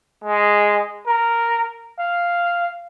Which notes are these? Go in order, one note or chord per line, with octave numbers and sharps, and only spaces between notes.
G#3
A#4
F5